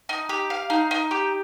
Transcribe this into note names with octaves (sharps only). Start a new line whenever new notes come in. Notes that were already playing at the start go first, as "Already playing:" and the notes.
D#4
G4
F5
D#4
D#4
G4